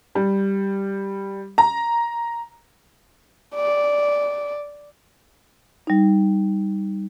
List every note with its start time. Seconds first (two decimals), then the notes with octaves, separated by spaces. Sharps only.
0.15 G3
1.58 A#5
3.55 D5
5.87 G3 D#4